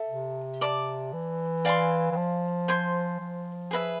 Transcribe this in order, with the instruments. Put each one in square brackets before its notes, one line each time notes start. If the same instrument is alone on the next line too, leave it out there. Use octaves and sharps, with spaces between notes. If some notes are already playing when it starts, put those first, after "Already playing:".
Already playing: [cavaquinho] A4 E5
[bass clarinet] C3
[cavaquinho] D5 A5 D6
[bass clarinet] E3
[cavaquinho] D5 F5 G#5 C6
[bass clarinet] E3
F3
[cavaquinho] C5 G#5 C6
[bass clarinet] F3
[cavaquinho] G#4 B4 E5